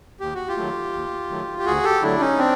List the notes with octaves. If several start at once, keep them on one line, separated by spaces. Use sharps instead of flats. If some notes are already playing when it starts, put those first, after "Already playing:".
D#2 G4
F#4
F4 G4
D#3 F#3 A3
D#2
D#3 F#3 A3
G4
D2 F#4 G#4
G4 A4
D3 F#3 A3 D4 E4
C#4 D#4
C4 D4